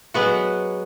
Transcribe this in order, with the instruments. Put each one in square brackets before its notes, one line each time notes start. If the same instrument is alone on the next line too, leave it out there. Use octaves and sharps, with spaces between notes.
[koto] F#3 G#3 B3 F#4